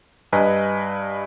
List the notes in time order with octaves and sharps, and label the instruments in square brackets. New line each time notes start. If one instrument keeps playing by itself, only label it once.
[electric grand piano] G2 B4 D#5 G#5 A#5